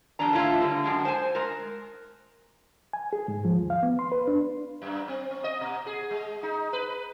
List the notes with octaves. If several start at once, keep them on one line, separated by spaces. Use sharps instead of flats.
F2 G#2 G3 B3 D4 A#5
D3 A3 C#4 E4 F4
D3 G3 A#3
F#2 G#3 D4
C5 G#5
G#3 A#4
G#5
G#4
G#2
F3
D#2
F5
B3
C6
B4
D4
F#2
C4
C4
D#5
B2
G#4
G#3
D#4
B4